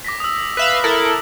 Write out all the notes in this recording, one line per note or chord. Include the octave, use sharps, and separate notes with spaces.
D6 A#6 B6
D#6 E6
B4 E5 F5 F#6 F#7
E4 A4 A#4